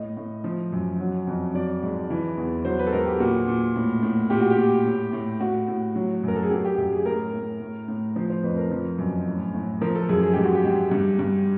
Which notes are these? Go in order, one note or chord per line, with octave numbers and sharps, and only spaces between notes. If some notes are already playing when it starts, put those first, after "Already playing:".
Already playing: A2 D#5
A2
F3
F#2
F#3
F2
F#3 D5
G#2
E3
E2
F#3 C5
B4
A4
G#2 A#4
G4
A#2 F#4
A#2
A2
A2
A#2 G4
F#4
G4
A#2
A2
A2
A2 F#4
A2
F#3
F#2 A#4
A4
G#4
F#3 G4
G4
F#2 G4
G#4
A2 A#4
A2
A2
A2
F3 C5
C5
F2 B4
A#4
F3
F#2
A2
A2
F3 A#4
A4
F#2 G#4
G#4
G#2 G4
F#4
G4
G#2
G2
G2